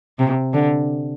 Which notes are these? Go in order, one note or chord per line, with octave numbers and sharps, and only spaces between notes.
C3
D3